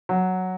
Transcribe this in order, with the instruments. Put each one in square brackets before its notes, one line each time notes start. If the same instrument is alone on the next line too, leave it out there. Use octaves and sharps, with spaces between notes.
[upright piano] F#3